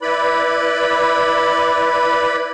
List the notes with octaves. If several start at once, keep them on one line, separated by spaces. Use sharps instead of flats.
E4 B4 D5 B5